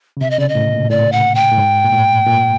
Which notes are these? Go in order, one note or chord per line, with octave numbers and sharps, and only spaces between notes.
C#3
C3 E5
D#5
C#3 D5
D#5
A2
A#2
A2 D5
F#5
G5
A2
G#2
A#2
A2
A#2